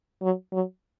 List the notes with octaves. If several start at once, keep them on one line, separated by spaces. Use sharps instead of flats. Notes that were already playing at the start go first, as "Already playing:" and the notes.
F#3
F#3